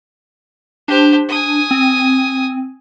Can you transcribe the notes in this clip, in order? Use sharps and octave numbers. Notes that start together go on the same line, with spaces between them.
D4 G4 C5
G#5 D#6
C4